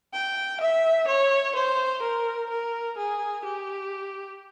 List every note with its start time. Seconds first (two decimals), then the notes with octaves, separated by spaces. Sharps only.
0.14 G5
0.61 E5
1.07 C#5
1.55 C5
2.02 A#4
2.50 A#4
2.97 G#4
3.45 G4